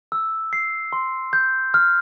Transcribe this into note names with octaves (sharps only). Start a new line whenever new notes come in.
E6
C7
C6
G6
F6